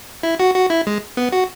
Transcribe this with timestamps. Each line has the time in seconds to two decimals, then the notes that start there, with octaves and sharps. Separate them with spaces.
0.23 E4
0.40 F#4
0.55 F#4
0.70 E4
0.87 G#3
1.17 B3
1.32 F#4